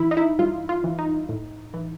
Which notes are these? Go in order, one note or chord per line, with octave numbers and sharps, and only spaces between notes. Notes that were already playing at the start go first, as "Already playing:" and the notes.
Already playing: E3 E4
D#4
E4
G2 F4
F4
E3
D#4
A2
E3